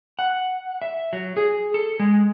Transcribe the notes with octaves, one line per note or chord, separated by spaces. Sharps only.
F#5
E5
F#3
G#4
A4
G#3